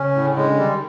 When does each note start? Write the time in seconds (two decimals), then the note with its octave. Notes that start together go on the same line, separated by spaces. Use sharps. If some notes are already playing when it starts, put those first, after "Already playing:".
Already playing: C#3 C#4
0.15 A2 D3
0.36 G#3
0.57 D#3 G3